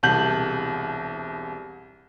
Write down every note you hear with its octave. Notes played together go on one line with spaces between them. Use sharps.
E1 C2 A5 G6 F#7